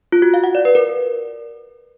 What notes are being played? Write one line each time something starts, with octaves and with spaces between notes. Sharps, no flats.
F4
F#4
F5
F#5
D5
B4
A#4